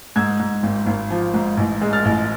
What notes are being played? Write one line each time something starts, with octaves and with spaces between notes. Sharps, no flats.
G#2 E6 G#6
G#2
G#1
G#1
F3
G#2
A1
G#3
F6 A6
A1